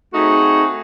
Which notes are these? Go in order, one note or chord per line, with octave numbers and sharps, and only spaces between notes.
A3 C4 D#4 F#4 G#4